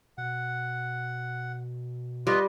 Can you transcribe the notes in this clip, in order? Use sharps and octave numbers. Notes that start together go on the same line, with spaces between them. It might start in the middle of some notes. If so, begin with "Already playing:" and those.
B2 F#5
G3 F4 B4 D#5